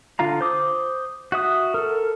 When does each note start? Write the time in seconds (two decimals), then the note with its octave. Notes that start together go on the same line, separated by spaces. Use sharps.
0.19 D3 F4 F5 A#5
0.41 C5 D6 D#6
1.32 F#4 E5 D#6
1.74 A4 A#4